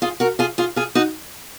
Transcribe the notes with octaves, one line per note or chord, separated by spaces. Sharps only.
F4 G#4
F#4 A#4
F4 G#4
F4 G#4
F4 G#4
D#4 F#4